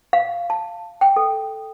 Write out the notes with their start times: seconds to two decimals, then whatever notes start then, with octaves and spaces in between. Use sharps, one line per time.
0.13 F5
0.50 A5
1.01 G5
1.16 A4